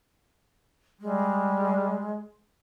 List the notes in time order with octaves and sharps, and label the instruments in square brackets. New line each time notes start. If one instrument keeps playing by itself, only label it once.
[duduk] G3 [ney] G#3